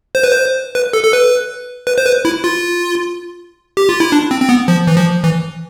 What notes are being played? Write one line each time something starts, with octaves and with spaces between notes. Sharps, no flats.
C5
B4
C5
B4
A4
A4
B4
B4
C5
B4
E4
F4
G4
F4
E4
D4
C4
C4
B3
F3
E3
F3
E3